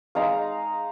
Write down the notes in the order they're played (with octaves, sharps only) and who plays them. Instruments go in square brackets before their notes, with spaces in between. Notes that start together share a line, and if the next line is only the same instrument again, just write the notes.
[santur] G#3 D#4 F5 A#5